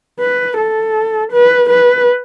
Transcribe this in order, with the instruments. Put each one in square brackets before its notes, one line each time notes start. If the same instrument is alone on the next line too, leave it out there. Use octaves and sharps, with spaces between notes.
[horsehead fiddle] B4
A4
B4
B4